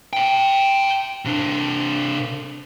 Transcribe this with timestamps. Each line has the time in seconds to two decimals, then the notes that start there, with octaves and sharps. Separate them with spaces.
0.13 E5 G5
1.25 C3 D4